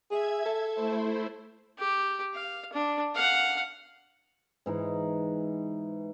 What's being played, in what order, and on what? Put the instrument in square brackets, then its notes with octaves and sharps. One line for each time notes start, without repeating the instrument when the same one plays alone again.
[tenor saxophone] G#4 [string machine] E5 G#6
[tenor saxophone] A4
[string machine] A3 E4 C5
[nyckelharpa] G4
F5
D4
F5 F#5
[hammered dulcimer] G#2 E3 D#4